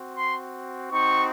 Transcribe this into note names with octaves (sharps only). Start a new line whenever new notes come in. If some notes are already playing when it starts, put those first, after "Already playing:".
Already playing: C4 F#4
C6
C4 D#4 F#4 C#6